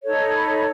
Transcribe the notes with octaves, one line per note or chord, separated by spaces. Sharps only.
D#4 A4 C#5
B5